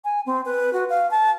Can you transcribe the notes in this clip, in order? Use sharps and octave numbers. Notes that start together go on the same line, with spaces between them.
G#5
C4
B4
F#4
F5
A5